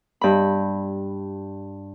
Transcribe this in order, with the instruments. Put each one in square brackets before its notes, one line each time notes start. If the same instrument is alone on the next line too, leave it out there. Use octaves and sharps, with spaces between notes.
[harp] G2 B5